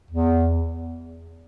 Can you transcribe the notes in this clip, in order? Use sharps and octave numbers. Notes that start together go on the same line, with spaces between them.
E2